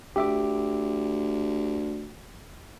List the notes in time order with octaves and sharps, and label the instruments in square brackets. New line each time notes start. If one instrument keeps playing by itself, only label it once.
[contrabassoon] D2 [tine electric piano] G4 E5 D6